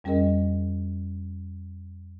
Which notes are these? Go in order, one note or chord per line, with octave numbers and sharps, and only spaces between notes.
F2 G3 C#4 G#4 A#4 D#5